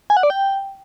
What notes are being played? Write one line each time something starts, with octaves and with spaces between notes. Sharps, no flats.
G#5
F#5
D5
G5